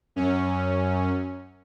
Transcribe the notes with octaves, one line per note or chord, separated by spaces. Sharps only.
F#2 C#4